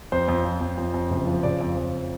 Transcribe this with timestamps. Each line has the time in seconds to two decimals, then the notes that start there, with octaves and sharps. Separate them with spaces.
0.12 F2 C5
0.28 F2
0.45 F3
0.61 F2
0.78 F2
0.94 F2
1.10 F#1
1.27 F3
1.43 C#3 D5
1.60 F2
1.77 F2